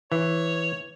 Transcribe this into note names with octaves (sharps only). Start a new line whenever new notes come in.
E3 C#5